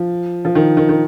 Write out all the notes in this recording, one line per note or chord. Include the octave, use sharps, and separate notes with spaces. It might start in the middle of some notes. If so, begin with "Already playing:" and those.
Already playing: F3
F3
D#3
D#3
D#3